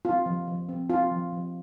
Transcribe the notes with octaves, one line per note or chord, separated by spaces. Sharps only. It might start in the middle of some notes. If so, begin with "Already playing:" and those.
C4 F4
F3
F3
C4
C4 F4
F3
F3